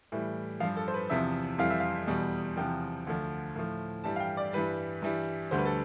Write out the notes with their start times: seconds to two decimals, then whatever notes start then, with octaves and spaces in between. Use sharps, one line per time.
0.12 A2 E3 G3
0.60 F3 F5
0.63 G2
0.77 A4
0.88 C5
0.94 B4
1.10 E2 C3 F3 E5
1.58 F2 E3 G3 F5
1.70 E5
1.80 F5
2.07 E2 B2 G3
2.57 E2 C3 F3 G5
3.07 D2 D3 F3
3.56 A2 F3
4.04 G2 E3 G3 A5
4.16 F5
4.20 G5
4.37 D5
4.53 G2 E3 G3 B4
5.02 G2 E3 G3
5.51 D2 D3 G3 C5
5.58 B4
5.65 A4